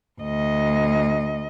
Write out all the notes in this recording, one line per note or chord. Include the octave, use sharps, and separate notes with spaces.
D2 D#5